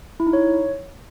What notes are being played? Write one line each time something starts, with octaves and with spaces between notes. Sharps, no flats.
E4
D#4
C#5